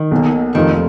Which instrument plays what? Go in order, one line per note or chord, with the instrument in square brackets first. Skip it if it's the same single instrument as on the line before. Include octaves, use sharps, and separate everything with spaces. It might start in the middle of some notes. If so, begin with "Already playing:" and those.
Already playing: [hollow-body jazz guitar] D#3
[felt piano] B1 B2 A#3
[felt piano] F1 F2 F3 A#3 F4 [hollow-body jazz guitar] D#3